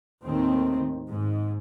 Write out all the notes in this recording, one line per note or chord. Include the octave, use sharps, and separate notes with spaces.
D#2 A2 D#3 C4
G#2